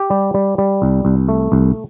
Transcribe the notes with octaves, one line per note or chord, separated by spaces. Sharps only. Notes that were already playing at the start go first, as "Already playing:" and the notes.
Already playing: G4
G3
G3
G3
C2
C2
A3
C2